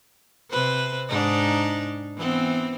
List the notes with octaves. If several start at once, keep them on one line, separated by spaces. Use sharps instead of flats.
C3 B4 C5
G#2 D4 D#4
E3 B3 C4